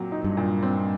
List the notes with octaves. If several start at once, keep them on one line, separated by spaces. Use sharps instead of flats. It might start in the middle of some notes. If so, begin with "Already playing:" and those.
Already playing: A#2 F#3 C4
D#4
G2
A#2
C4